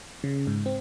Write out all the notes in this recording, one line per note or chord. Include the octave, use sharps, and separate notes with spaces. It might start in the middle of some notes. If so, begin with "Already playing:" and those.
C#3
G#2
C4